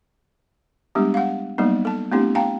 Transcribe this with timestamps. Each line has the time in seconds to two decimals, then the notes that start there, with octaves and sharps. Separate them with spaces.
0.95 G3 G#3 B3 D4 G4
1.14 F5 F#5
1.58 F#3 G3 A#3 B3 D#4
1.85 A4 A5
2.12 A3 B3 C4 D4 E4 G4
2.35 F5 G5 A5 A#5